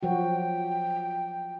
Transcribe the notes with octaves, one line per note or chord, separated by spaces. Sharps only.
F3 F#3 F#4 G5